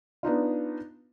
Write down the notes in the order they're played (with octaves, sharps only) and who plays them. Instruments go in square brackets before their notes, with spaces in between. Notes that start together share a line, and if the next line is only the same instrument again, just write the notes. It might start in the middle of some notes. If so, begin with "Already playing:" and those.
[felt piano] B3 D4 D#4 F4